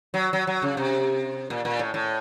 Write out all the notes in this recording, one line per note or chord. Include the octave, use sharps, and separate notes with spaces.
F#3
F#3
F#3
C#3
C3
A#2
A#2
A2
A2